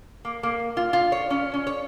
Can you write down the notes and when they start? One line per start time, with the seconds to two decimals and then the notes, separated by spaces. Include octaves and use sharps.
0.25 A#3
0.43 A#3
0.77 F4
0.93 F4
1.12 C#5
1.30 C#4
1.54 C#4
1.67 C#5